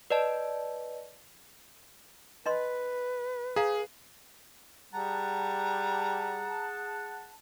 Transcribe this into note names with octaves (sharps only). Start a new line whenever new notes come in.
B4 D5 D#5 A5
D4 B4 D#5 C6
G#4 F5 A#5
G3 G#4 F#5 A5 A#5